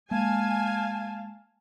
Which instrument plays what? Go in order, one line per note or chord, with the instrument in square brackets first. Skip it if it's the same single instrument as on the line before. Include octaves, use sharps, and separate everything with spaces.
[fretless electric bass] G#3 A#3 [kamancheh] F5 A5 [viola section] G#5